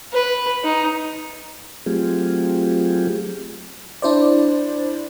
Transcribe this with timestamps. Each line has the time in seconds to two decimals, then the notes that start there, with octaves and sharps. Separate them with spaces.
0.13 B4
0.64 D#4
1.86 F#3 A3 C4 F4 G4 G#4
4.02 D4 E4 C5 D5